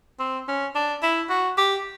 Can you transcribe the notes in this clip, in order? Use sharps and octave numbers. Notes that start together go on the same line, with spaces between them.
C4
C#4
D4
E4
F#4
G4